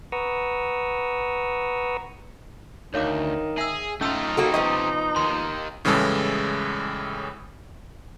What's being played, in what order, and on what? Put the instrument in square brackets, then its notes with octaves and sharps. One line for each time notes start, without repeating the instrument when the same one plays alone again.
[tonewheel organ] B4 F#5 A#5 C#6 D#6 E6
[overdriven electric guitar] D2 [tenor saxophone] D#3 [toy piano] C#5 F5 D6
[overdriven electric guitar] G#4 [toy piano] E5 E6
[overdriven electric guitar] A3 F4 [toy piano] C#4 E6 [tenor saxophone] D#4
[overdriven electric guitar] C3 G3 [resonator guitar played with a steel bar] A#3 F#4 A4
[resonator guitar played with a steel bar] F3 B3 D#5 [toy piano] C#6
[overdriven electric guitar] D#2 D#3 [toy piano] C6
[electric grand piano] A2 C#3 E3 G3 G#3 A4